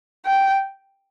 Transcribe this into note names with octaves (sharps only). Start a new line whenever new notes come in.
G5